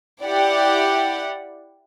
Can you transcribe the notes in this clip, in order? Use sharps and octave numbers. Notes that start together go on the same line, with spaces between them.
E4 G4 D5 F#5